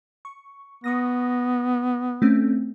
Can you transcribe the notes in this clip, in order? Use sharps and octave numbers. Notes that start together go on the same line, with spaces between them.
C#6
B3 C#6 D#6 A#6
A3 C4 C#4